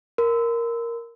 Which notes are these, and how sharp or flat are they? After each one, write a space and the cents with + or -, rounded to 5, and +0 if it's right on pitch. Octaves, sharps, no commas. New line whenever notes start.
A#4 +0 C6 -40